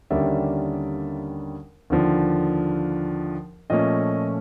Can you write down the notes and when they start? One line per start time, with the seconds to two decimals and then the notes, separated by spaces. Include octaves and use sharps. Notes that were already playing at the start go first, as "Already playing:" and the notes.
0.10 D#2 D3 G3 A#3 C#4 D5 E5
1.90 D#2 D3 F3
3.70 A#2 F3 A3 C#4 D#5